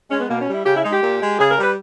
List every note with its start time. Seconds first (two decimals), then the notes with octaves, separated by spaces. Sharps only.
0.10 G#3 C#4
0.20 B3
0.29 B2 A#3
0.41 C#4
0.48 G3
0.54 E4
0.65 C#3 G4
0.75 E4
0.84 G#3 D#4
0.93 G4
1.02 A#2
1.21 G#3
1.39 C#3 G#4
1.51 A#4
1.58 G3
1.63 B4